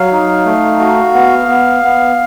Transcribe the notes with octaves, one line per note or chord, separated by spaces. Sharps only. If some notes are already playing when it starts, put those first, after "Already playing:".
Already playing: F#3 F5
D#4
A3
F#4
B3
B3
B3